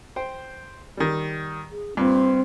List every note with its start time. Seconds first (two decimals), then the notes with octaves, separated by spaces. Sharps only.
0.16 C5 G5
0.97 D#3 G3
1.71 G#4
1.97 G2 A#2 C4